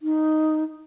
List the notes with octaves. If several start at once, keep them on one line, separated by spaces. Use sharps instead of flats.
D#4